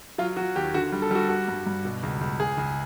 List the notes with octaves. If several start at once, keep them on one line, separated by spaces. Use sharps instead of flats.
F#3 F4
F#3 F#4
D#2 G4
D3 F#4
G3
A4
G3 F#4
G3 F#4
G2
G2
B2
C#2
C#2
C#2 G#4
C#2